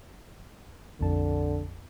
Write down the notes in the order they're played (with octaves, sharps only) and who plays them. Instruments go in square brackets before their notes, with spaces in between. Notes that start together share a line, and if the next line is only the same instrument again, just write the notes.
[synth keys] A#1 F2 A5 [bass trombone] D3